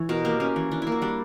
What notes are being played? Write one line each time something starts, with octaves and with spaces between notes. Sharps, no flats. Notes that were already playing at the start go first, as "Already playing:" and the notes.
Already playing: E3 C#5
B2 A#4
A#3 G4
A#3 C#4
E3
E3 D4
A#3 E4
F#4
G3 D4